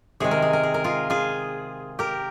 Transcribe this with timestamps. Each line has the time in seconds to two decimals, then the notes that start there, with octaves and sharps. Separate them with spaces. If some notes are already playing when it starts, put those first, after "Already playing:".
0.20 C3 D#3 G#3 G#4
0.31 A#4
0.42 G#4
0.53 A#4
0.63 G#4
0.74 A#4
0.84 F4 G#4
1.10 F4 G#4
1.99 G4 A#4